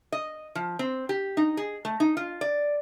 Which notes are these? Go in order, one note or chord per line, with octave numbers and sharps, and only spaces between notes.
D#5
F3
C4
G4
D#4
G#4
A3
D#4
F4
D5